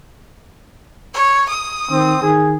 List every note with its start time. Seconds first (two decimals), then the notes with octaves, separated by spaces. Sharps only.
1.14 C#5
1.49 D#6
1.91 D#3 C4
2.22 D#3 G#4